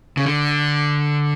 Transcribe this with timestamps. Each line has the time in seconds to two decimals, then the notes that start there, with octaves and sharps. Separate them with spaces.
0.17 C#3
0.25 D3